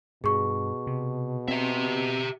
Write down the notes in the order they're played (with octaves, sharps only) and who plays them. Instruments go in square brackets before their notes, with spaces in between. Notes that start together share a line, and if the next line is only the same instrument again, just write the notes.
[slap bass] G2 [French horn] B2 [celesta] G#4 C#6
[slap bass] C3
[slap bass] C4 [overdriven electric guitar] G4 E5